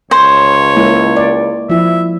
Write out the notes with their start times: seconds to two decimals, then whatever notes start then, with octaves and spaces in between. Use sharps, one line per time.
0.11 C#2 C5 C#5
0.76 G#3 A#3 E4
1.17 D5
1.70 F3 E4 E5